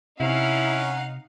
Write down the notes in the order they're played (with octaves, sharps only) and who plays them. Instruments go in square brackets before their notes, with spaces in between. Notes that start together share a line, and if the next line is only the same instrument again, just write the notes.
[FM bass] C3 [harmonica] C#4 F#5 [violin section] D#4 F5 [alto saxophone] E4